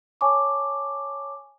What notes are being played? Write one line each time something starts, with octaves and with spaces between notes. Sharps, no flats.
C#5 G#5 A5 C#6 D6